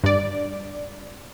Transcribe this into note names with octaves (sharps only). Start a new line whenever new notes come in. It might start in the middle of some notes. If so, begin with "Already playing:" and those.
G2 D5